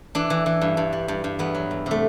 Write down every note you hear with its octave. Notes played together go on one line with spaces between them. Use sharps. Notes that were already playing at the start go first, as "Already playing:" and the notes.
E3 D4
E3
E3
G2
G2
G3
G2
G2
E2 B3
F#3
E2
C3 A3